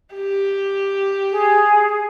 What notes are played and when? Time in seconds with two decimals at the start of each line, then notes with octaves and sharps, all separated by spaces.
0.15 G4
1.31 G#4